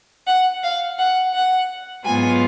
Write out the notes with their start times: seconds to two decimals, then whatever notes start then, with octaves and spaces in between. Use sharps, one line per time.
0.26 F#5
0.62 F5
0.98 F#5
1.33 F#5
2.05 G#2 F#3 B3 F4 G#5